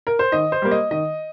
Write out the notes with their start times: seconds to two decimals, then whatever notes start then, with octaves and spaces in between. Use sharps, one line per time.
0.07 A#4
0.19 C5
0.32 D#3 D#5
0.52 C5
0.62 G3 A#3
0.71 D#5
0.91 D#3 D#5